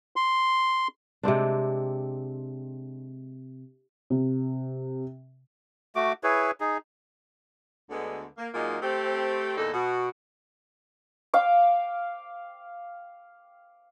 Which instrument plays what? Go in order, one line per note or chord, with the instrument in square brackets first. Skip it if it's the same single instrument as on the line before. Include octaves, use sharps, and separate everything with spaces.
[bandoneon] C6
[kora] C3 G#3 C4 D4
[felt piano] C3
[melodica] A3 F#4 D6
E4 G#4 B4 C#5
D#4 G#4
[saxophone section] D2 D3 G#3 B3
A#3
A#2 F#3 G#3 A#3 D#4 D#5
A3 C4 G4
E2 A#2 D#4 A4
B2 F#4
[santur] F5 G5 D6